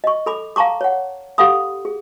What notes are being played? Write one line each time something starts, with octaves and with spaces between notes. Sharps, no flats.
D#5 C#6
A4 B5 D6
F5 A5 A#5 C#6 D6
C#5 F#5
G4 A4 F5 F#5 B5 D#6
G#4